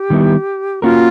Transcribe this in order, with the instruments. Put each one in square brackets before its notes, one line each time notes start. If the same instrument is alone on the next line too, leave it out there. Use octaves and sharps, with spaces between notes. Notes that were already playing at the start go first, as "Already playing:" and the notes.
Already playing: [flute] G4
[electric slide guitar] D#3 G3 B3 E4
[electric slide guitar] A#3 C#4 F#4 A#4 [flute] F4